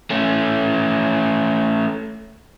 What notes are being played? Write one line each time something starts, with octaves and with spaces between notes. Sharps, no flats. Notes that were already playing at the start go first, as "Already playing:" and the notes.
A3 C#4